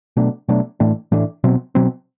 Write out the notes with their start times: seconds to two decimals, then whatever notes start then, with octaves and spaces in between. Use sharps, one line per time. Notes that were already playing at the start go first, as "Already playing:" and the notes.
0.17 B2 F#3 A3 D4
0.48 B2 F#3 A3 D4
0.80 A2 E3 A3 D4
1.12 A2 E3 A3 D4
1.44 B2 F#3 C4
1.75 B2 F#3 C4